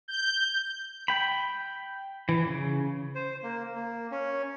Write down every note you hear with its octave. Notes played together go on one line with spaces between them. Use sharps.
G6
G5 B5
E3
C#3
C5
A#3
A#3
C#4